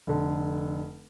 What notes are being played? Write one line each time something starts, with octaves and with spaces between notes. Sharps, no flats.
F1 D3